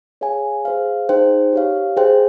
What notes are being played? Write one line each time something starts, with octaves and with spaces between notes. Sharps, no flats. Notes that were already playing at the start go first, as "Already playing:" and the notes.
G#4 C#5 F5 G#5
G#4 C5 F5
D#4 G#4 C5 G5
G4 C#5 F5
G#4 C5 G5